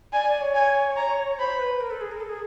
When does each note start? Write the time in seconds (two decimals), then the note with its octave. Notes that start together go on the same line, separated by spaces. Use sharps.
0.13 D5 G#5
0.27 D5
0.41 C#5
0.54 G#5
0.96 A#5
1.38 C5 B5
1.60 B4
1.80 A#4
1.91 A4
2.01 G#4
2.12 A#4
2.20 A4
2.29 G#4